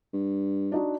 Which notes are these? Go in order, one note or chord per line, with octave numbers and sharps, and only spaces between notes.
G2
D4 D#4 F#4